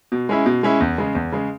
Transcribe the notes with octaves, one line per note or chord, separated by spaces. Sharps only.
B2
G#3 C#4 E4
B2
G#3 C#4 E4
E2
C#3 G#3
E2
C#3 G#3